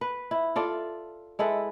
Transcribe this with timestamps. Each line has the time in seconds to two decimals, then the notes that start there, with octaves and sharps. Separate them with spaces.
0.01 B4
0.31 E4
0.56 F4 A4 D5
1.39 G#3 E4 A4 B4